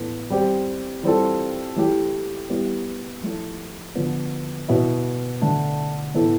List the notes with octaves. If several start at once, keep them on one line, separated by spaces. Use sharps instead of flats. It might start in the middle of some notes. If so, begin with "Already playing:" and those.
Already playing: A2 E3 B3 D4 A4
G3 C4 G4
E3 G3 C4 F4 A4
E3 A3 E4 G4
G3 B3 E4 G4
F3 A3 E4 A4
D3 F3 B3
B2 B3 E4
D3 A3 D4
A2 E3 B3 E4 A4